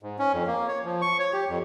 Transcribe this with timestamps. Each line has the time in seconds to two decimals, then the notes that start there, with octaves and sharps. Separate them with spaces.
0.03 G#2
0.19 C#4
0.33 F2
0.47 A#3
0.68 C#5
0.85 F3
1.02 C#6
1.19 C#5
1.33 G4
1.49 F2